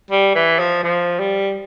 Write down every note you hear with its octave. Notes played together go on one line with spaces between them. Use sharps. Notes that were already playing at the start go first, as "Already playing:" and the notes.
G3
E3
F3
F3
G3